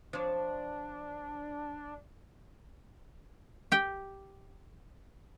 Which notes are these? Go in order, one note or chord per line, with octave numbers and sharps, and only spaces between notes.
F3 D4 C#5
G4 G5